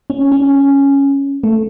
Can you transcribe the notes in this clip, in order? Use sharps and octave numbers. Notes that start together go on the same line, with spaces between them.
C#4
C#4
A3